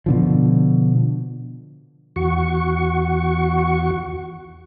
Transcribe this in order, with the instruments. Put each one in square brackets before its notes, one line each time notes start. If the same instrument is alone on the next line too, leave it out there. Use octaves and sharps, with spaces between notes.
[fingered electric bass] B2 D3 F3
[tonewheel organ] E2 F#4 C#6